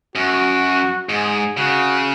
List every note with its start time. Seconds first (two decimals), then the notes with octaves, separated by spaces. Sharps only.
0.15 F#2 F#4
1.09 G#2 G#4
1.57 C#3 F#4